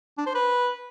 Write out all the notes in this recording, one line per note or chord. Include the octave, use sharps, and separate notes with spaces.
D4
C5
B4